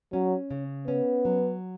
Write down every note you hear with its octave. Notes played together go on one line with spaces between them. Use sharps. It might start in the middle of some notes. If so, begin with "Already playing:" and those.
F#3 C#4
C#3
B3 C#4
F#3